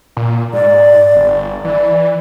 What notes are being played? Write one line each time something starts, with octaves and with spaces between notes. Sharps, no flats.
A#2
G#2 D5
G1
E3 D5